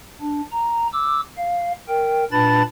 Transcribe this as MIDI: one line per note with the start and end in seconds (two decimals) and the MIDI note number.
0.21 0.41 62
0.52 0.87 82
0.93 1.21 86
0.93 1.21 88
1.38 1.72 77
1.88 2.24 70
1.88 2.24 79
2.32 2.63 46
2.32 2.63 62
2.32 2.63 71
2.32 2.63 81
2.32 2.63 83
2.32 2.63 93